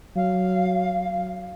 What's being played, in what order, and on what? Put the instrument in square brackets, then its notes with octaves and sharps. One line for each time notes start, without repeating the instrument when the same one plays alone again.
[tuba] F#3 [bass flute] F5